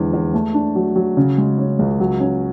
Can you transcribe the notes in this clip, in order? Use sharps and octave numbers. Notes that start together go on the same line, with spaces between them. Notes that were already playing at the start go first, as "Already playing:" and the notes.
Already playing: E2 D3 G#3
E2
A3
D4
F#3
F#3
C#3
G#3
C#4
C#2
F#3
C#4